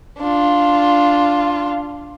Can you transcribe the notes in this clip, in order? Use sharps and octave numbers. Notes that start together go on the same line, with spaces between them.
D4 F4